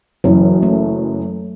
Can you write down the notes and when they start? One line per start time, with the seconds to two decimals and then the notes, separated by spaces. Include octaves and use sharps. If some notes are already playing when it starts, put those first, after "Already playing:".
0.24 F#1 F#2 E3 F#3
0.63 A3